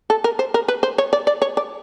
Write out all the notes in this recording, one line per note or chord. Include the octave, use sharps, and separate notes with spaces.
A4
A#4
C5
A#4
B4
C5
C#5
D5
D5
C#5
D5